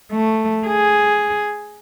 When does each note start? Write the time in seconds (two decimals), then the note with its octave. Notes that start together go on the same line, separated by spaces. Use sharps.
0.12 A3
0.67 G#4